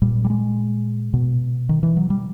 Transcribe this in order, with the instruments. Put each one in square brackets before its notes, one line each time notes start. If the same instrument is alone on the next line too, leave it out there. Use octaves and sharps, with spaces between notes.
[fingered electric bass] A#2 G3
G3
G#3
B2
D#3
E3
F#3
G3